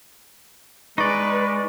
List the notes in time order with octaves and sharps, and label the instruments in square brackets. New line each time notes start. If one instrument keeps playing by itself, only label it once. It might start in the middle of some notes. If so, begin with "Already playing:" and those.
[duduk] G#3 [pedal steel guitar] D#4 D5 [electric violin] B4 [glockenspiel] C#6 A6